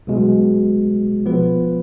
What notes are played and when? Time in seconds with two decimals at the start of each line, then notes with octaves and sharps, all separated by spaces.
0.07 B1 B2 G#3
1.26 F3 B3 F4 B4